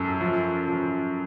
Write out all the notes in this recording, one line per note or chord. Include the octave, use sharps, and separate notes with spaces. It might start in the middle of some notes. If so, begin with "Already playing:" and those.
Already playing: F#2 A4
F3
F3